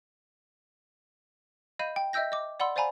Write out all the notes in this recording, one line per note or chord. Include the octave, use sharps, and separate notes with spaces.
D#5 F5 B5 G6 D#7
G5
D#5 E5 G5 E6 G6 A#6
D#5 D6
D5 F#5 B5 C6 E6
C5 D5 F5 G#5 A#5 B5